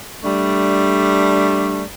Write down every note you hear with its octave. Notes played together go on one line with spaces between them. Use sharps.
G3 A3 D4